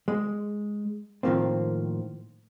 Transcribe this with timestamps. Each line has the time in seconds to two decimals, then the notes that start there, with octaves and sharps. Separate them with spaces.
0.08 G#3
1.23 A2 D#3 F3 A#3 C4